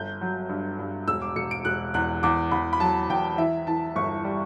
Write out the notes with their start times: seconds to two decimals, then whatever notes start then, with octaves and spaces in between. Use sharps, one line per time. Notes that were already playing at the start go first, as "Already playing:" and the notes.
Already playing: G1 G6
0.21 F#3
0.49 G2
0.79 G2
1.08 E1 E6
1.22 D6
1.36 E1 C#7
1.51 D7
1.65 E1 F#6
1.94 E2 F#6
2.23 E2 D6
2.51 E2 B5
2.73 B5
2.80 F#3 A5
3.10 E2 G5
3.38 E3 E5
3.67 E3 A5
3.96 G1 C#6
4.24 G3